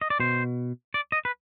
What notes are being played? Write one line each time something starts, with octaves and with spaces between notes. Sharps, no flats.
D#5
D5
B2 C5
D5
D#5
B4